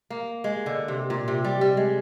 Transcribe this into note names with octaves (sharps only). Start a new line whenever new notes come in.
A#3
G#3
D3
C3
A#2
C3
G3
G3
G#3